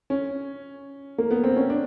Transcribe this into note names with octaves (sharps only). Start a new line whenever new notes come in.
C#4
A#3
B3
C4
C#4
D4